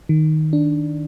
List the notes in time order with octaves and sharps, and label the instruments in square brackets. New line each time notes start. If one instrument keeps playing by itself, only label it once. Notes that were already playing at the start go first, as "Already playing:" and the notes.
[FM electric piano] D#3
D4